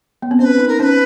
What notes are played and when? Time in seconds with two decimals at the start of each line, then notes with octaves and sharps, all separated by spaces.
0.22 B3
0.31 C4
0.39 C#4 C5
0.44 B4
0.59 D#4
0.68 A#4
0.80 C#4 B4 C5